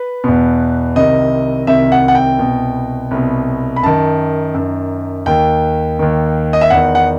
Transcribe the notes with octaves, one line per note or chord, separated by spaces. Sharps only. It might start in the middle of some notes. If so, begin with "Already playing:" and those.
Already playing: B4
E2 B2
C2 C3 D#3 D#5
C2 C3 D#3 E5
F#5
F#5
G5
C2 B2
C2 B2
B5
F#2 D#3 A5
F#2 D#3
D#2 D#3 G5
D#2 D#3
D#5
E5
E2 D#3 F#5
F#5